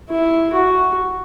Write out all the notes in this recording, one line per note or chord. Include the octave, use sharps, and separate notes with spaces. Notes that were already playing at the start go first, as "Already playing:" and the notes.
E4
F#4